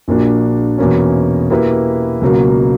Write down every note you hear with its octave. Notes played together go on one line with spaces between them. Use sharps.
A#1 A#2 A#3 D4 F#4
E2 B2 A#3 C#4
B2 A#3 E4 G4 B4
C#2 B2 F#3 A#3